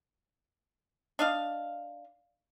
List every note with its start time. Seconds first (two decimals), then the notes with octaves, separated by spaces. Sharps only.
1.19 D4 D#5 F5